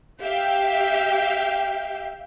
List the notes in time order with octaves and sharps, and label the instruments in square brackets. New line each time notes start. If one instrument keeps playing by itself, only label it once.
[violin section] G4 E5 F5 G5